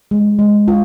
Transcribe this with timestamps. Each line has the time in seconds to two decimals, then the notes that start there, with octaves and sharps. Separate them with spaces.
0.11 G#3
0.39 G#3
0.68 F4